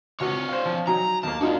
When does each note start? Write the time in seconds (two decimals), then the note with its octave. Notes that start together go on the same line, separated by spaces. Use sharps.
0.20 C#2 D4 F#4 C#5
0.49 C5 F5
0.65 F3
0.87 F#3 D#4 G#5 A#5
1.23 D#2 A#3 A5
1.41 F#2 D4 D#4 F4 F#4